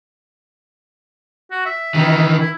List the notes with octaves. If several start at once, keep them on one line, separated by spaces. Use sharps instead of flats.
F#4
E5
D#3 E3
E4